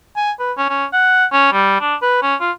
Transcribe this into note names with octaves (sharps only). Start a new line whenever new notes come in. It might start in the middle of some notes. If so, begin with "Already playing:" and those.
G#5
B4
C#4
C#4
F#5
C#4
G3
D4
B4
C#4
F4